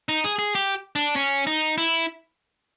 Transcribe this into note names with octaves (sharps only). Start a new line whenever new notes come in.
D#4
G#4
G#4
G4
D4
C#4
D#4
E4